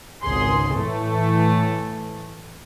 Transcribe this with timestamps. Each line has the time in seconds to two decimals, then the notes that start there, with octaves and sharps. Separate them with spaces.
0.23 G#1 C#2 G#4 C6
0.74 A2 E3 A3